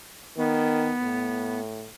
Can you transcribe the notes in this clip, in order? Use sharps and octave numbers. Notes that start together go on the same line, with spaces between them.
D#3 B3
A2